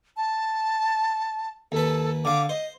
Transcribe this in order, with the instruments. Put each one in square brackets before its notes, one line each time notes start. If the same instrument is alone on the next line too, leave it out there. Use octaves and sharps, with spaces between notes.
[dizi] A5
[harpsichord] D#2 B4 [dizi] A4
[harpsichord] D3 F5 [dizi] D6
[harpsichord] C5 [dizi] D#5